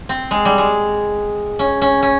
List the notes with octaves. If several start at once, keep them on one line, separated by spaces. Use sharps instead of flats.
C4
G#3
G3
G#3
C#4
C#4
C#4